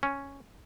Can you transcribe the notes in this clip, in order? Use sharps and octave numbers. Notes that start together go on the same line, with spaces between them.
C#4